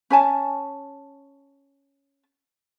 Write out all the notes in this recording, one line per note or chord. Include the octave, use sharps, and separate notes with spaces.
C#4 C#5 G#5 A5